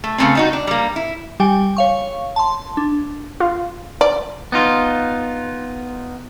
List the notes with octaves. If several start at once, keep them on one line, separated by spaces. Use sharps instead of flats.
A3
C#3 F3 A3 B3 C4
G3 D#4 F#4
D4
G3 A#3
E4
G3 G4 G5 G#5
C#5 F5 C#6
A5 C6
D4
F4
D5
B3 D#4 F4